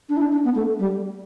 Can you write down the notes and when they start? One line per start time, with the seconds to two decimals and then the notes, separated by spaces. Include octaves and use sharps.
0.09 D4
0.17 E4
0.21 D4
0.33 D4
0.44 B3
0.55 A3
0.79 G3